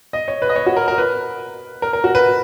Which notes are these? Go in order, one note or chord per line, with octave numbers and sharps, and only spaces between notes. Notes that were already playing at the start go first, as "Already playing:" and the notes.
D#5
C#5
B4
D#5
C#5
F#4
A#4
A#4
B4
A#4
A#4
F#4
B4